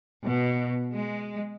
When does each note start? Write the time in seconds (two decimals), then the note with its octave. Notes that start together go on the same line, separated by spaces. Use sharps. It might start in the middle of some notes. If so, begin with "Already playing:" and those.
0.25 B2
0.93 G#3